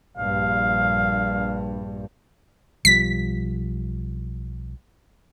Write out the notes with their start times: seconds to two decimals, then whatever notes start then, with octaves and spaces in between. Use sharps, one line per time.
0.17 A#1 G2 F5
2.85 B1 F3 G3 B6